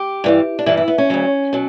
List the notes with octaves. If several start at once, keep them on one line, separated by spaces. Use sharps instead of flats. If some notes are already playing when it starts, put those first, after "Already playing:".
Already playing: G4
G2 E3 G3
D4
G2 E3 G3 E4
E4
B3
C#4
D2 C#3 F#3
B2 F#3